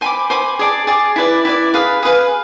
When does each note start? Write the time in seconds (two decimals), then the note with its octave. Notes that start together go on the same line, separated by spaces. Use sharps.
0.01 C5 G#5 B5 D6
0.30 C5 G#5 B5 D6
0.59 G#4 D5 A5
0.87 G#4 D5 A5
1.16 E4 B4 D5
1.45 E4 B4 D5
1.74 G#4 B4 F5
2.03 G#4 B4 F5